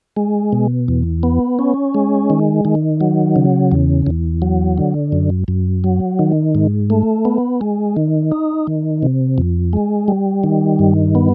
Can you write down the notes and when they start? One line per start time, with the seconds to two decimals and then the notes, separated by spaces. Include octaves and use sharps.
0.17 G#3
0.53 B2
0.88 E2
1.23 B3
1.59 C#4
1.95 G#3
2.30 D#3
2.65 D#3
3.01 F#3
3.36 C#3
3.72 E2
4.07 E2
4.42 F#3
4.78 D3
5.12 F#2
5.48 F#2
5.84 F#3
6.19 D#3
6.55 G#2
6.90 A3
7.25 B3
7.61 G#3
7.96 D#3
8.32 D#4
8.67 D#3
9.03 C3
9.38 F2
9.73 G#3
10.08 G3
10.44 D#3
10.79 G2
11.15 B3